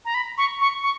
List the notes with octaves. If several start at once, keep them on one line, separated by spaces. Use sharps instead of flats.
A#5
B5
C#6
C#6
C#6